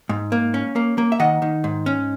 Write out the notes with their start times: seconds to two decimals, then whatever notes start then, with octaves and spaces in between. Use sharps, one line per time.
0.09 G#2
0.32 A#3
0.54 C#4
0.76 A#3
0.98 A#3
1.12 E5
1.19 D#3 D#5 F#5
1.42 D#3
1.64 G#2
1.86 C#4